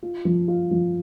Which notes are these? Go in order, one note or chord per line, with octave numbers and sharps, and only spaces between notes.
F4
F3
F4
F3